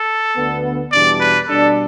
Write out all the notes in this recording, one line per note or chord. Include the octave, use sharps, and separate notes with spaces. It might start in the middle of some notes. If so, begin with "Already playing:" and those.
Already playing: A4
D2 D3 B3
E2 B2 G3 D4 D5
B4
B2 G3 D4 A4